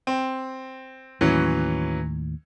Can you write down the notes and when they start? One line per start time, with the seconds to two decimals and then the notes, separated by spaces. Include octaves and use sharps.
0.07 C4
1.21 D#2 A2 E3 F#3 C#4